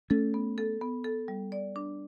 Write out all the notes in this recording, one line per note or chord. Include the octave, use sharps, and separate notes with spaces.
A3 C#4 A4
B3
A4
B3
A4
G3
D5
D4